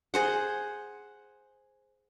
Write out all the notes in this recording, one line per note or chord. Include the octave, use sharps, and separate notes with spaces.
G#4 C5 F#5